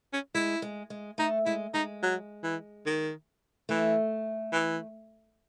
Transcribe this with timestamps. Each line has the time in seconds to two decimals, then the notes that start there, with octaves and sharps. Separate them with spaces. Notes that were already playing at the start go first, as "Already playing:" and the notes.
0.13 C#4
0.35 G#3 E4
0.62 G#3
0.90 G#3
1.18 A3 D#4
1.46 G#3 E4
1.74 G#3 D#4
2.03 F#3
2.43 E3
2.86 D#3
3.69 E3 A3
4.53 E3